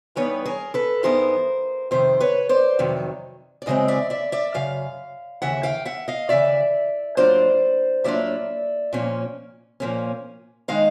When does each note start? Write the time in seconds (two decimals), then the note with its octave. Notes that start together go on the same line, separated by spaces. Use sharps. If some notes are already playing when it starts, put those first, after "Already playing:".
0.15 G2 E3 G3 B3 D#4 B4 C#5
0.45 G#4 A#4
0.74 A4 B4
1.03 G2 E3 G3 B3 D#4 A#4 C5
1.91 F2 C3 D#3 C5
2.20 B4 C#5
2.49 C5 D5
2.79 F2 C3 D#3 F#3
3.62 D5
3.66 F#2 C#3 E3 G#3 C4 D#5
3.88 D5 E5
4.10 D5 E5
4.32 D5 E5
4.54 F#2 C#3 F5
5.42 D#2 C#3 E3 E5 F#5
5.63 F5 G5
5.85 E5 F#5
6.08 D#5 F5
6.29 D#2 C#3 E3 D5 E5
7.17 A2 F#3 A#3 D4 F4 C5 D5
8.04 A2 F#3 A#3 D4 F4 D5 E5
8.93 A#2 F3 A#3 C#4
9.80 A#2 F3 A#3 C#4
10.68 D#3 G#3 D#4 D#5 F5